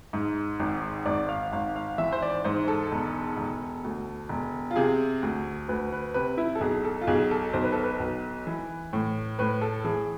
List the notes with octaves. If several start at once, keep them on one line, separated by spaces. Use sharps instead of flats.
G#2
G#1
G#1 D5
F5
G#1 F5
F5
E3 E5
C5
D5
G#2 C5
A4
E1
E1
D2
E1
F4
C3 G#4
D2
D2 B4
B4
C3 B4
E4
A4
B1 G#4
A4
F4
B1 G#4
A4
B1 C5
B4
A4
B4
B1
E3
A2
A2 B4
A4
E3 G#4